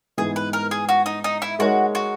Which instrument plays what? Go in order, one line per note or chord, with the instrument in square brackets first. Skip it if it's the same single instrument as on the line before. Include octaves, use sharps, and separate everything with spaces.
[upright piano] G#2 E3 B3 [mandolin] G#4
[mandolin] B4
A#4
G#4
F#4
D#4
D#4
E4
[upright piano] G#3 D#4 A#4 C#5 [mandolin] F#4
[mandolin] F#4